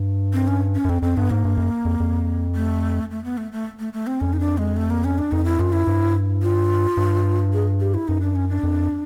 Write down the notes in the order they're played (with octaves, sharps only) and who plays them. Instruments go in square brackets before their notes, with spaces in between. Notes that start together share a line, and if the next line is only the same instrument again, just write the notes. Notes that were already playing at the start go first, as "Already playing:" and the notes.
Already playing: [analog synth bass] G2
[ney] C4
C#4
C#4
[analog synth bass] F#2
[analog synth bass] F2 [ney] C4
[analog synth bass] F2 [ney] C4
[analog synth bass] G2 [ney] B3
[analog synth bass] G#2 [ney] A#3
[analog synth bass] G2
F#2
F2
F2
[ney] A3
A3
B3
A3
A3
A3
A3
C4
[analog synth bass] F2 [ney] C#4
[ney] D#4
D4
G#3
A3
A#3
C#4
D4
[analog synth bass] F2 [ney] D#4
[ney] E4
[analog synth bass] F#2 [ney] F4
[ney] E4
[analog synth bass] G2
[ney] F4
[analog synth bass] G2
[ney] G#4
G4
E4
[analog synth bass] F#2 [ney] D#4
[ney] D4
C#4
D4
[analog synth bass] F2